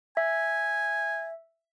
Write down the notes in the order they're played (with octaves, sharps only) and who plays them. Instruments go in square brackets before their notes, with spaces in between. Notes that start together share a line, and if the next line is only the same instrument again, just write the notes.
[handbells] E5 [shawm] G#5